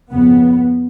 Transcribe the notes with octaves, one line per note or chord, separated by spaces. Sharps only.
F2 C#3 B3